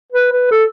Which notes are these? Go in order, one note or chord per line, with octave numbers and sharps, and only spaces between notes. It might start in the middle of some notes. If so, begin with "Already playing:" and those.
B4
B4
A4